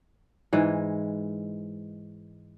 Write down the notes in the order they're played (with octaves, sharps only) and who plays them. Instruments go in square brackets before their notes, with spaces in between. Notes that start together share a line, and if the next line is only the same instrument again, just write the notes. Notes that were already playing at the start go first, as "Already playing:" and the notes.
[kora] G#2 E3 G#3